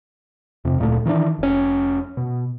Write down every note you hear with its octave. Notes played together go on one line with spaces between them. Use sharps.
F2 C3
D1 A#2 A3
D#3 E3 B3 D4
F1 C#4
B2